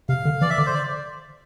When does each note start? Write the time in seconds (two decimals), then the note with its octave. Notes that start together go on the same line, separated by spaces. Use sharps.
0.09 C3 F5
0.25 D3
0.41 E3 D5
0.50 E5
0.58 D3 D5
0.66 C5
0.74 D5